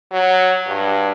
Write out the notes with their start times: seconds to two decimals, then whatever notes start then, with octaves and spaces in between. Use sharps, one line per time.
0.12 F#3
0.67 G2